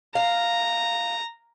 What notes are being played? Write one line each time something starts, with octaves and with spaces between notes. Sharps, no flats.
F5 A#5